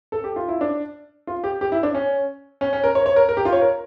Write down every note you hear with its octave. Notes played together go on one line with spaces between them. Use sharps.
A4
G4
F4
E4
D4
F4
G4
G4
E4
D4
C#4
C#4
C#4
A#4
C#5
C#5
A#4
A#4
G4
F4
C#5
A#4